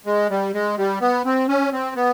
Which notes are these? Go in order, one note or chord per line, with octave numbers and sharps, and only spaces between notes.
G#3
G3
G#3
G3
B3
C4
C#4
C4
B3